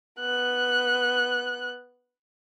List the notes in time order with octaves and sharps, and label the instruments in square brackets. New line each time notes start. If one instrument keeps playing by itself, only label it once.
[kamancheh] B3 F#6